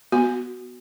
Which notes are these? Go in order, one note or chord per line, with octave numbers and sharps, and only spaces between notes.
B3 F#4